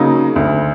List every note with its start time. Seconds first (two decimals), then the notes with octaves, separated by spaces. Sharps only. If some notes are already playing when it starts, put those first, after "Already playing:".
Already playing: C#3 F#3 A#3 D#4
0.36 D2